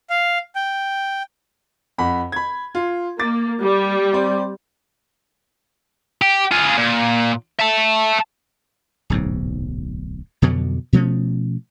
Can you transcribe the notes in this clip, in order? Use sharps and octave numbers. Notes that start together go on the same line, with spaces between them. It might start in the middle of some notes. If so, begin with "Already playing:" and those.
F5
G5
F2 F#5 B5
B5 G#6
F4
A#3 D6 A6
G3
C4 D5
G4
F4 G#4
A#2
E5 A5
D1 B1 G#2
F2 B2 D3 F#3
B2 F3 A3 C#4